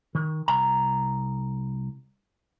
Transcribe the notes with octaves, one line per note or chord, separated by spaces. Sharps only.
D#3
C2 A#5